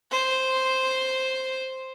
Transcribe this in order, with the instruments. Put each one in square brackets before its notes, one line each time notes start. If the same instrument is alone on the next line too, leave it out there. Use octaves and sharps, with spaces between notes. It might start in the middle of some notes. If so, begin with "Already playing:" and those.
[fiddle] C5